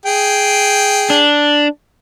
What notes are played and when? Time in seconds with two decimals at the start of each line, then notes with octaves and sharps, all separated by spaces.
0.06 G#4 G5
1.10 D4